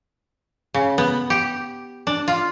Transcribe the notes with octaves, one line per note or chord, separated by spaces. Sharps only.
C#3
B3
G4
D4
F4